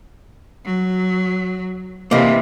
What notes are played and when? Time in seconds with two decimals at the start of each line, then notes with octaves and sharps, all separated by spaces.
0.65 F#3
2.11 C3 E3 A#3 D#5